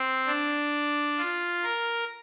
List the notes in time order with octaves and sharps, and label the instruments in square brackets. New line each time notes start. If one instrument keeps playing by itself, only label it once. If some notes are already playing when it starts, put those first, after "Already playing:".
Already playing: [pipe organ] C4
D4
F4
A#4